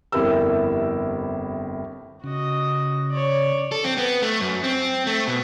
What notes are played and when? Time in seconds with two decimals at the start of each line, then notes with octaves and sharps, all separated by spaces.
0.12 G1 F2 E4 G4 A#4 E6
2.24 C#3 F#4 D#5
3.11 C#5 D5
3.72 A4
3.84 C4
3.98 B3
4.22 A3
4.41 F#2
4.64 C4
5.07 A3
5.27 B2